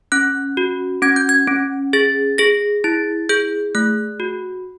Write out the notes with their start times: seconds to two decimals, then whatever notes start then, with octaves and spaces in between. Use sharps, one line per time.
0.12 C#4 F#6
0.57 F#4
1.02 C#4 G#6
1.16 G6
1.29 G#6
1.47 C#4
1.93 G#4 A6
2.38 G#4 A#6
2.84 E4 A6
3.29 G#4 G6
3.75 A3 F#6
4.20 F#4